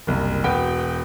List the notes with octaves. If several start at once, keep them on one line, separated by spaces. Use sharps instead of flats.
F#1 C2
E1 F#4 B4 G5